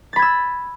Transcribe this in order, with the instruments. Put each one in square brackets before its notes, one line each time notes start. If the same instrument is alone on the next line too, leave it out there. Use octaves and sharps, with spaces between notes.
[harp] A6
B5
G#6
E6